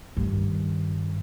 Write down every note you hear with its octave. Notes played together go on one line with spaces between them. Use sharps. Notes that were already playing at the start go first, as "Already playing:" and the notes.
G2 D#3